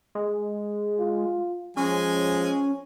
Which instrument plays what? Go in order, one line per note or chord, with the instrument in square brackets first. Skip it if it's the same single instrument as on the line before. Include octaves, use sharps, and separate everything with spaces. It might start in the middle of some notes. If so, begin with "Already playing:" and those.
[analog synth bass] G#3
[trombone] F4
[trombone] F3 [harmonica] G#3 G#5 [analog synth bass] C#4